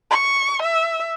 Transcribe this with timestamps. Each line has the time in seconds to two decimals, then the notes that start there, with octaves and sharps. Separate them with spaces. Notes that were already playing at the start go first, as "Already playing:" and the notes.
0.11 C#6
0.62 E5